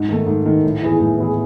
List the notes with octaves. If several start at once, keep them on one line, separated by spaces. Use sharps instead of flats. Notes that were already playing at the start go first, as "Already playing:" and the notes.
Already playing: G#2
D#3 A3
G#2
D#3 A3
A2
E3 B3 E4 G#4
A2
E3 B3 E4 G#4